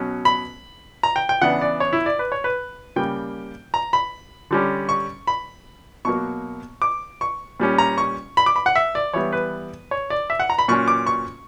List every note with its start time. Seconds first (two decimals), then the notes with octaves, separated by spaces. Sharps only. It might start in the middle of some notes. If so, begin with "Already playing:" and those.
Already playing: B2 F#3 C#4
0.25 B5
1.03 A#5
1.16 G5
1.29 G5
1.41 C#3 E3 B3 D4 F#5
1.61 D5
1.80 C#5
1.93 E4
2.06 D5
2.19 B4
2.32 C#5
2.44 B4
2.96 C#3 G3 A#3 G5
3.74 A#5
3.93 B5
4.51 D3 G3 C#4
4.89 C#6
5.27 B5
6.05 B2 F#3 A#3 C#6
6.82 D6
7.21 C#6
7.60 A#2 G3 C#4
7.78 A#5
7.98 C#6
8.37 B5
8.46 D6
8.56 B5
8.66 F#5
8.76 E5
8.95 D5
9.14 E3 G3 B3 C#5
9.33 B4
9.91 C#5
10.10 D5
10.30 E5
10.40 F#5
10.50 A#5
10.59 B5
10.68 A#2 F#3 C#4 C#6
10.88 D6
11.07 C#6